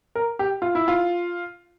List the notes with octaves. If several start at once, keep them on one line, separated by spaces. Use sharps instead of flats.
A#4
G4
F4
E4
F4